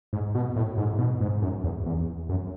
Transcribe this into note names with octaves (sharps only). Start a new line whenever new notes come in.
G#2
B2
A2
G#2
B2
G#2
F#2
E2
E2
F#2